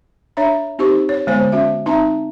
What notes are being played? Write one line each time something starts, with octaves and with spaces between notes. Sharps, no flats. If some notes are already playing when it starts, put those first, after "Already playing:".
D4 C#5 E5 A#5
C4 D#4 G4 C5 C#6
C#5
D3 G#3 B3 C5 C#5 G#5
C#4 F#4 E5
C4 D#4 E5 A5 A#5